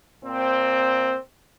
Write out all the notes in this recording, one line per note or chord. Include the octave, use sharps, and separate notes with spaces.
A#2 C4